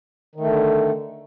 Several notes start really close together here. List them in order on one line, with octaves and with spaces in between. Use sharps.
D#3 A3 D3